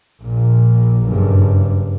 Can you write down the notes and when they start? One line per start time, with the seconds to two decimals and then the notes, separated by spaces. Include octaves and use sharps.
0.23 A#1 A#2
1.06 F#1 G2